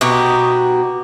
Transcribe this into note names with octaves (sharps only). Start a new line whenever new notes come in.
B2 D#4 F#4 G4